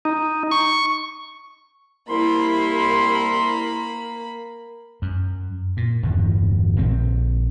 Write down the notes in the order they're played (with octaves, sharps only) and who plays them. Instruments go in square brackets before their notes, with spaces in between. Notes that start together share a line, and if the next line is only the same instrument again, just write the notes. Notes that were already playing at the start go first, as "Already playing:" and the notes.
[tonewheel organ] D#4
C#6
[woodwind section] C2 E4 C6 [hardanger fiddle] A#3 B5
[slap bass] F#2
A#2
D1 G1 E2 G2
A#1 G#3 C4